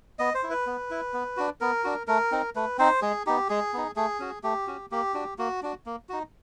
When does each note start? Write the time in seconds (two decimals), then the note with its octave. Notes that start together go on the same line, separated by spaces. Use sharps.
0.19 B3 D#5
0.34 C5
0.43 E4
0.50 B4
0.67 B3
0.91 E4
1.14 B3
1.37 D4 F#4
1.60 B3 A#4
1.84 D4 F#4
2.07 A3 A#4
2.32 C4 D#4
2.56 A3 B4
2.78 C4 D#4 C5
3.02 G#3 G#4
3.27 B3 D#4 G4
3.49 G#3 G#4
3.74 B3 D#4
3.96 A3 G#4
4.20 C#4 F#4
4.43 A3 G4
4.67 C#4 F#4
4.91 A#3 G4
5.14 D4 F#4
5.38 A#3 F#4
5.62 D4 F#4
5.86 A#3
6.09 D#4 F#4